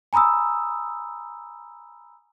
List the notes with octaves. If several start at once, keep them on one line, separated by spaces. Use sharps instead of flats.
G#5 A#5 B5 D#6 E6